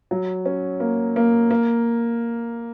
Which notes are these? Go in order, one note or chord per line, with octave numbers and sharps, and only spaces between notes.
F#3
C#4
A#3
A#3
A#3